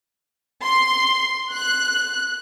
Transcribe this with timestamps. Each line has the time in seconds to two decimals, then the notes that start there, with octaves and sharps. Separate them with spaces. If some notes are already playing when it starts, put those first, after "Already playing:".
0.64 C6
1.51 F#6